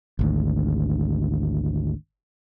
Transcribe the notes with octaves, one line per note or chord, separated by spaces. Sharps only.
G#1 D2